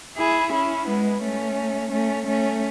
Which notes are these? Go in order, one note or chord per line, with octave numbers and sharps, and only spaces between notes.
E4 G#4
C#4 E4
G#3 B3
A3 C#4
A3 C#4
A3 C#4